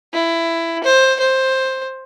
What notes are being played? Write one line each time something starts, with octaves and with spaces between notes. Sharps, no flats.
E4
C5
C5